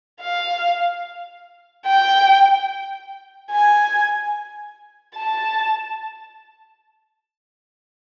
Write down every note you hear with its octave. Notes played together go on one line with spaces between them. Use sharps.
F5
G5
G#5
A5